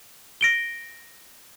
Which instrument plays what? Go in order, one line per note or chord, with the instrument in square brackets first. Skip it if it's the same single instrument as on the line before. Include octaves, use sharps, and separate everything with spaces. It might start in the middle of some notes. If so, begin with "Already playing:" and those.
[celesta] A#6 D7 G7